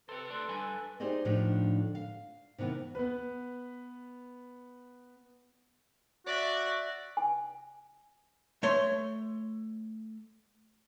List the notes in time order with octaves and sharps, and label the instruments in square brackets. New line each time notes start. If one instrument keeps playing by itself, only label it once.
[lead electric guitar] G4 C5 [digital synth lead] A4 [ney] B4
[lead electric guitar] D2 D4 [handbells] C6
[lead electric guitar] G2 [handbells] G#5 B5
[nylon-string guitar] D#4 G4 G#4 C5 D5 D#5
A2 D3 F3 D4 D#4
F5
C3 D#3 E3 B3
[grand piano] B3 B4
[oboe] F#4 [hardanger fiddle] D5 E5
[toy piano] G#5
[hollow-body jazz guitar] A3 C#5 C6